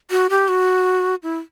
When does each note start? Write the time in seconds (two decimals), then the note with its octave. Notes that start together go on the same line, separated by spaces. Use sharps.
0.11 F#4
0.30 G4
0.48 F#4
1.23 E4